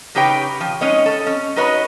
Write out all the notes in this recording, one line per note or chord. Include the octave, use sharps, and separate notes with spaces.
C#3 D#4 G4 B4 C#5 G5
F3
G#3 C#4 D#4 C#5 D#5
A4
C#4
D#4 F#4 B4 C#5 D#5